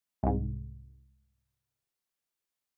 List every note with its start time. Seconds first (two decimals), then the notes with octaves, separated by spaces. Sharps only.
0.23 C2 G#2